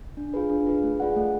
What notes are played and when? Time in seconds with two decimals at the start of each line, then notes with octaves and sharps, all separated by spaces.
0.17 D4
0.34 F4 G#4 B4
0.50 D4
0.66 F4 G#4 B4
0.83 A3
1.00 F4 G#4 D5 F#5
1.16 A3